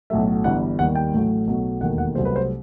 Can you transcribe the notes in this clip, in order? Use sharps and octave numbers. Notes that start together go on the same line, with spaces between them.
B1 A2 F#3 A3 E5
G1 G2 E3 G3 F#5
D#2 D#3 G3 F#5
G5
A1 A2 F#3 A3
B1 B2 F#3 A3
E1 D#2 D#3 A3 F#5
F#5
C2 C3 F#3 A3 C5
B4
C5